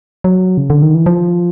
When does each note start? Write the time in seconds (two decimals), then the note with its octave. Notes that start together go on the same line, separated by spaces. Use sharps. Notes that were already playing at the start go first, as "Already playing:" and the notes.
0.24 F#3
0.57 C#3
0.70 D3
0.82 D#3
0.95 E3
1.06 F3